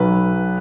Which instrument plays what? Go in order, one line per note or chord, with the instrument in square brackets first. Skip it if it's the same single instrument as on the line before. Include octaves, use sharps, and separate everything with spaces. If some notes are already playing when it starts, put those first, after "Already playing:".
Already playing: [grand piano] B1 F#3 B4